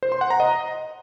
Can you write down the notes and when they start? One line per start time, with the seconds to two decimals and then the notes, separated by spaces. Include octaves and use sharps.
0.03 C5
0.12 C6
0.21 F#5
0.30 A#5
0.40 D#5